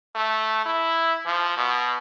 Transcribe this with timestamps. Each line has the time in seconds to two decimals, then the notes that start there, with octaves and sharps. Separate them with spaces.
0.15 A3
0.66 E4
1.26 F3
1.57 B2